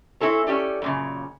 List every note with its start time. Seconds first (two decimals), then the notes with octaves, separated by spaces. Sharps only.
0.20 C4 E4 G#4 A4 C#5
0.47 C#4 G4 A4 D5
0.82 F#2 A#2 C#3